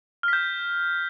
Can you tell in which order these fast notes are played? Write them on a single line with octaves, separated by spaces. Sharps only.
F6 B6 G6